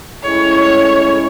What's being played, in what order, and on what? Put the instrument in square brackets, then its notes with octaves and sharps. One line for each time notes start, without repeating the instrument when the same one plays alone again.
[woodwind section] A2 G#3 C#4 E4 [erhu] C#5
[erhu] C#5